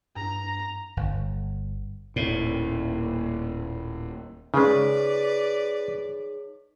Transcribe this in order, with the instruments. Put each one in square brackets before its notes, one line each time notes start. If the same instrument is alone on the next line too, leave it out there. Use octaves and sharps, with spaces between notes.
[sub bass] G2 [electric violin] A#5
[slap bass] G1
[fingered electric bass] D#1 [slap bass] A2
[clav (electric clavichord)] C#3 G#3 [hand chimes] D#4 G#4 C#5 [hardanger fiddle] B4 D5